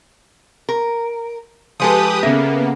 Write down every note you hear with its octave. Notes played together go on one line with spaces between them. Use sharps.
A#4
F3 G#3 G4 A4 B4 D#6
C#3 A#3 B3 A4 E5 A#6